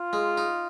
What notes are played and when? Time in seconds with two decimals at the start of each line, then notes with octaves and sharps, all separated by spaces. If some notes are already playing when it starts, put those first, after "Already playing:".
Already playing: F4
0.13 G#3
0.37 D#4